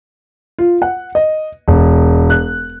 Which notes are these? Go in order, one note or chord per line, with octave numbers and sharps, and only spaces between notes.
F4
F#5
D#5
E1
F#6